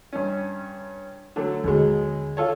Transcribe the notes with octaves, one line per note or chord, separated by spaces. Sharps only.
G2 C#4
D3 F#3 A3
D#2 B2 D3 F#3 G#3
F4 A4 C#5